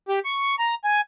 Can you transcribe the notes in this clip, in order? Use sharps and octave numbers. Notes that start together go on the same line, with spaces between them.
G4
C#6
A#5
G#5